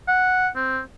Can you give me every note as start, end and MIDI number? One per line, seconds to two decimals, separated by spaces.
0.08 0.48 78
0.56 0.80 60